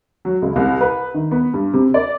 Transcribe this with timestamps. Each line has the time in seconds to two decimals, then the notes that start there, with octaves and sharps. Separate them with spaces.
0.25 F#3
0.42 C#2
0.56 C2
0.81 B4
1.14 D#3
1.31 B3
1.54 G2
1.73 C3
1.94 D5